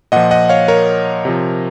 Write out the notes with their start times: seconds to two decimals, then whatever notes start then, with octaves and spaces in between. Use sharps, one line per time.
0.12 A#2 F3 D#5 F#5
0.31 D#5 F#5
0.49 C#5 F5
0.68 A#4 C#5
1.25 C3 F3